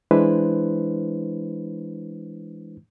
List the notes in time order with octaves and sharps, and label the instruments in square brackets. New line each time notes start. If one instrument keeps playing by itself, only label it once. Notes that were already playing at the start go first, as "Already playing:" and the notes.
[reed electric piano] E3 G#3 D4 E4 B4 C5